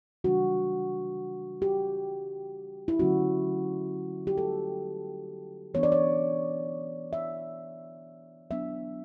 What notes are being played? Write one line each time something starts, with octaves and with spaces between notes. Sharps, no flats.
C#3 E3 G3 D4 F#4
G4
E4
D3 F#3 A3 C#4 F#4
G4
A4
E3 B3 D4 C#5
D5
C#5
E5
F#3 B3 D4 E5